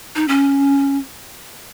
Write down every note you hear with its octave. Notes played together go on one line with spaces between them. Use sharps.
D#4
C#4